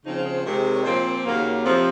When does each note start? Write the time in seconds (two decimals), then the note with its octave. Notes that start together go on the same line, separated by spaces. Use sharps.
0.05 C#3 F3 C4 D#4
0.15 F4
0.25 G#4
0.35 C5
0.45 C3 D#3 G#3 C4
0.75 C#5
0.85 A#2 F3 C4 C5
1.25 D#2 C#3 F#3 A#3
1.65 F2 C3 F3 C4